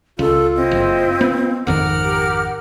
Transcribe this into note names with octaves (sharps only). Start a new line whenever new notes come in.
C#2 F4 A4
C4 E4 D#5
F#1
B3
G#1 F2 D#3 A#4 F#5 D6 F6
G4